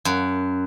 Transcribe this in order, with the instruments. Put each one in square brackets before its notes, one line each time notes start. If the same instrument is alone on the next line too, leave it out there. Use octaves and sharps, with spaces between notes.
[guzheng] F#2